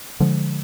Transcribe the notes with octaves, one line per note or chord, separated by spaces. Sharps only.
D3 F3 G#3